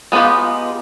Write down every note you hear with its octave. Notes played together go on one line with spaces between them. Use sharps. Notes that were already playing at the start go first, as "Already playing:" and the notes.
G#3 B3 D#4 F4 G4